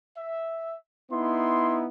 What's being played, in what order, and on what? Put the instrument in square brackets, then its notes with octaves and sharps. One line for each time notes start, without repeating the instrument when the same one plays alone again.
[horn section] E5
[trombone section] B3 D#4 E4 [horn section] C6